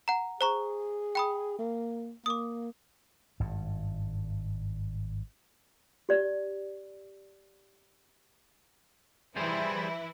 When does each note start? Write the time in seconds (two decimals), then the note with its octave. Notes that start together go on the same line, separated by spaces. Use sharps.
0.08 F#5 A#5
0.41 G#4 C5 A#5 C#6
1.15 G5 B5 D#6
1.59 A#3
2.26 A#3 D6 D#6
3.40 G#1 G2
6.09 G4 D5
9.36 E3 G3 E4 G#4 C5